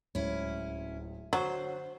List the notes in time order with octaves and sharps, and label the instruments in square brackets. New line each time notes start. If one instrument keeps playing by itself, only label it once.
[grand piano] D1 C#2 [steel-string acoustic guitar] C#4 E4
[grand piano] D3 F#4 [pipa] F#3 [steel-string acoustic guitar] C5